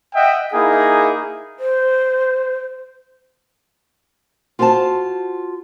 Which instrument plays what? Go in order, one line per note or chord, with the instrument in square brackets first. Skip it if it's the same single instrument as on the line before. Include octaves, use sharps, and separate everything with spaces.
[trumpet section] D#5 E5 F#5 G5
A#3 D#4 E4 G#4
[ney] C5
[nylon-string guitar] F4 F#4 C5 D5 A5